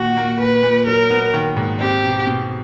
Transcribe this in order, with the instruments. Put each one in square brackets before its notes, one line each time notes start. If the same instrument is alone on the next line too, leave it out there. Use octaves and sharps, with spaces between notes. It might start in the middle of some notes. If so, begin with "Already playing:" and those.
Already playing: [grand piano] A#2 D#3 [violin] F#4
[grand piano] A#3
[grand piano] A#2 [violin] B4
[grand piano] A#2
[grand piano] F#3 [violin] A#4
[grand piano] B3
D#3
G#2
[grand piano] C4 [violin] G4
[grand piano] B2
B2